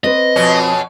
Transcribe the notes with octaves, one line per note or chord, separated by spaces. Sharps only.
C4 B4 D#5
F2 B2 C#4